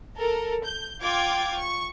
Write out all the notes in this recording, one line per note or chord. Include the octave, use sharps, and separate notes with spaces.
A4 A#4
G6
F4 G5 D6 G#6
C#6